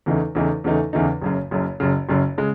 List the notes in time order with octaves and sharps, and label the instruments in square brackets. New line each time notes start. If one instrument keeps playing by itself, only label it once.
[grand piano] E2 C#3 E3 A3 D#4
E2 C#3 E3 A3 D#4
E2 C#3 E3 A3 D#4
E2 C#3 E3 A3 D#4
F#1 F#2 C#3
F#1 F#2 C#3
F#1 F#2 C#3
F#1 F#2 C#3
C#3 G#3